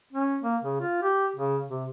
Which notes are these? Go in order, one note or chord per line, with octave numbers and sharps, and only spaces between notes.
C#4
A#3
C#3
F4
G4
C#3
C3